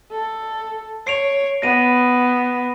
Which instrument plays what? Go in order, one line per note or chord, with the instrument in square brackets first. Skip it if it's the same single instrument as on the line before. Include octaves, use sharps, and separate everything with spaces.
[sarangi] A4
[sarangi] C#5 [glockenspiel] C7 D7 F7
[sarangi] B3 [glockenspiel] A#6 D#7